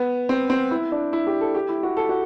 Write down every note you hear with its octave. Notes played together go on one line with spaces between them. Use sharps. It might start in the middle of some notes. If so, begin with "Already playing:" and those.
Already playing: B3
C4
C4
E4
D4
E4
G4
A4
G4
E4
F#4
A4
F#4